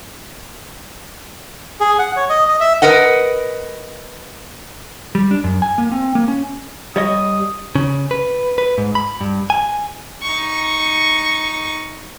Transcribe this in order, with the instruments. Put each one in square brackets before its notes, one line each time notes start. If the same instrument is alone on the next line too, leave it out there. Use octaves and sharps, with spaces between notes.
[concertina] G#4
F#5
C#5
D#5
D#5
E5
[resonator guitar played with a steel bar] A#4 B4 D#5 F#5
[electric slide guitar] G3
D4
F#2
G#5
A#3
C4
A#3
C#4
[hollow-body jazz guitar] G3 C#5 D#5 [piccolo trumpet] D#6
[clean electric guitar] C#3
B4
B4
G#2
B5
G2
G#5
[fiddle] D#4 C#6